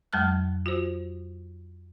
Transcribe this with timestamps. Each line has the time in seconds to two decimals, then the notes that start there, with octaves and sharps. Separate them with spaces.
0.13 F2 F#3 G#3 A5 F6 F#6
0.66 F4 F#4 C5